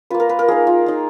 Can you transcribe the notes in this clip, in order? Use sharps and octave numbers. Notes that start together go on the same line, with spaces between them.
A#3 F4 B4
A#4
B4
A#4
A#3 D#4 G#4
F4
A#3 D#4